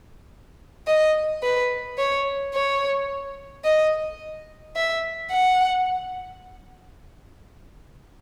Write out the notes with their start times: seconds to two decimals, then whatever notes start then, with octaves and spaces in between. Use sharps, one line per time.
0.87 D#5
1.43 B4
1.98 C#5
2.54 C#5
3.65 D#5
4.76 E5
5.31 F#5